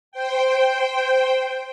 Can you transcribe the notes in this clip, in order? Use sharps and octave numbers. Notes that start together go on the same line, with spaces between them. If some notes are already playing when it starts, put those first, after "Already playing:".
C5 G5